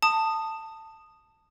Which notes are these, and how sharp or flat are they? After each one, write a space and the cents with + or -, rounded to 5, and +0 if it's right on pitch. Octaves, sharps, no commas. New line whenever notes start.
A5 +15 D#6 -10